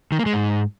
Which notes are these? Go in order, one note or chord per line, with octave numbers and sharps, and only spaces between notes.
D#3
A#3
G#3
G#2